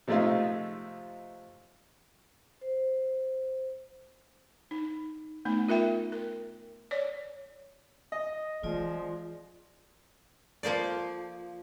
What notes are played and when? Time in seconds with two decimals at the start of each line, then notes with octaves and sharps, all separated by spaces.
0.08 C3 F3 G#3 A3 D#4 F4
2.61 C5
4.71 D#4
5.45 A3 B3 D#4
5.68 F4 A#4 E5 G5
6.12 A#4
6.91 C#5 D5
8.12 D#5
8.63 E3 F3 G#3 C4 F4 D5
10.63 F3 A#3 C5 D5